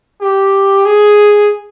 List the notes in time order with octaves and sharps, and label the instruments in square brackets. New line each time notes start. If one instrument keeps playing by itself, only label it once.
[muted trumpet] G4
G#4